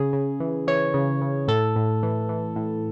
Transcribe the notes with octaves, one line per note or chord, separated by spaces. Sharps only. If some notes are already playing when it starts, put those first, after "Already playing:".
Already playing: C#3 G#4
C#3
E3
E3 C#5
C#3
C#3
A2 A4
A2
E3
E3
A2